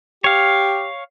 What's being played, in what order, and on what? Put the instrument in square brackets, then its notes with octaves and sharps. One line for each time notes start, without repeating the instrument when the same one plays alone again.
[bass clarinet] G4 [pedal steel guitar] C#5 F5